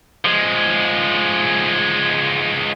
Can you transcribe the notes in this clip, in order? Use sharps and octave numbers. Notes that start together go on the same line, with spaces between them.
F3 G#3